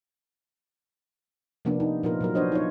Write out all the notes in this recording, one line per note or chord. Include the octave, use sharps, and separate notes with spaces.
C3 F3 A#3 B3 D4
D#4
A#2 F3 B3 F4 A#4
A#2 F#3 A#4
F3 B3 D4 C5 C#5 D#5
D#4 F4 C#5